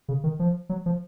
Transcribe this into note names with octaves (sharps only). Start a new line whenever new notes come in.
C#3
D#3
F3
F#3
F3